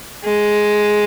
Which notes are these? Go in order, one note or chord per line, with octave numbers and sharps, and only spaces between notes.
G#3